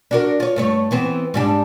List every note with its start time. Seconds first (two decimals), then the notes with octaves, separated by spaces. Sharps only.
0.11 D4 F#4 A#4
0.40 F4 C#5
0.56 G2 A3 C#5
0.91 E3 B3 C4
1.34 G#2 G3 D4